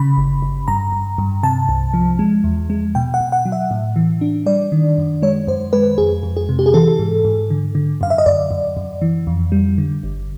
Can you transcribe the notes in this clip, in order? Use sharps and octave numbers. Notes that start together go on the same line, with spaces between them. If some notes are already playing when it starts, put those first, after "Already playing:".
Already playing: C#3 B5
G1
G1
G2 A#5
G2
G2
C3 A5
C2
F3
G#3
E2
G#3
B2 G5
F#5
B2
F#5
F#3
E5
A2
E3
D4
G3 D5
D#3
F#2
G#3 C#5
F#2 C5
G#3 B4
F2 G#4
F2
G#4
C3
G4
G#4
E3 A4
G#2
G#2
D3
D3
F#2 F5
E5
D#5
F#2 D5
F#2
F#2
E3
F2
G3
D3
G1